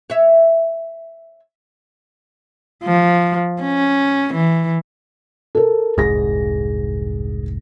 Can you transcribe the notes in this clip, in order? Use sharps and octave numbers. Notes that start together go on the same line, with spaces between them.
C#5 E5
F3
C#4
E3
A4 A#4
F1 C2 G#2 G#4 A#6